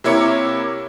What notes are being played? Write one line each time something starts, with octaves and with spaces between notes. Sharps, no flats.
C3 A#3 E4 C#5 D6 C#7